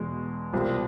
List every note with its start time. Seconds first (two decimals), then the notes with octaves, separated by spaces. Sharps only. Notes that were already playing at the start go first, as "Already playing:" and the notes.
Already playing: E2 B2 G#3
0.53 C2 B2 G3 C4 F4